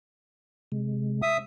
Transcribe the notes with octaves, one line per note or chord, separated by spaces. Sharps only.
C3 G#3
E5 D#6